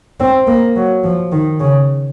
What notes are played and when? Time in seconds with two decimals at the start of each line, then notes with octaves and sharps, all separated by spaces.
0.20 C4
0.47 A#3
0.76 F#3
1.04 F3
1.32 D#3
1.60 C#3